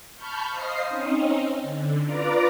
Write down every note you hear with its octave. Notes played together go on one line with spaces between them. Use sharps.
A5 B5 C#6 F6 G6
C5 D#5 F5 D#6 C7
C4 C#4 D#4
D3
F4 B4 D5 A#5 D6